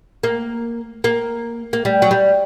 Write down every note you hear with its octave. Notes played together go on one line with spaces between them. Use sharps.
A#3
A#3
A#3
G3
F#3
G3